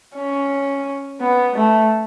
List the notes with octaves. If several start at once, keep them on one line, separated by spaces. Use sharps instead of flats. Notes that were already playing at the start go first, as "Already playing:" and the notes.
C#4
B3
A3